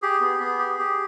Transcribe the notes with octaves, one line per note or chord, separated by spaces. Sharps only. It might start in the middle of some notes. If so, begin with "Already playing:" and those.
G4 G#4
B3
B3
G4
G4